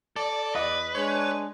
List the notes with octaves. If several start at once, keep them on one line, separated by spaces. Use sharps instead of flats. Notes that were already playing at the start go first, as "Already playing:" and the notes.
A4 D5
E2 B4 D#5
G#3 D4 C#5